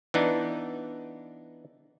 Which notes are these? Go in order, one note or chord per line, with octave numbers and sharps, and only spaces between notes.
E3 B3 D4 D#4